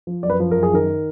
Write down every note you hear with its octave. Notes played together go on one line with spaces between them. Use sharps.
F3
F#2 D5
B4
F3
A#4
F#2
G#4
D#3 A#4